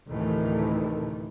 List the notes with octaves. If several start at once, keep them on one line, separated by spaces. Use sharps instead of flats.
D2 A2 C3 D#3 E3 A3